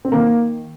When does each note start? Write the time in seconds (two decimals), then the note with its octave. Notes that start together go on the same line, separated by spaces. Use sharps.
0.05 C4
0.12 D#3 A#3